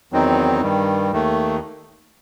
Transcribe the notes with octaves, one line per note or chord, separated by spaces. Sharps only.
E2 D#3 F#3 C4 D#4
G2 D#3 G3
D#2 D#3 A3